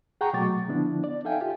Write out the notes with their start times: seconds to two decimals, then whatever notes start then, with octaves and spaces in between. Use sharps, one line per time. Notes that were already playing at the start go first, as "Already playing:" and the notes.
0.21 G#4 F#5 G5 A#5 C#6
0.33 B2 F#3 A3 C#6 D6 A6
0.68 D3 F3 B3 D4 E4
1.04 D5
1.24 D#4 A4 E5 F5 G5 G#5
1.41 F4 G4